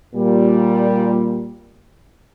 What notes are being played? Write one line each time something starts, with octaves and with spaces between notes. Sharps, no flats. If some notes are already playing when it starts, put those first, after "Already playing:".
A#2 G3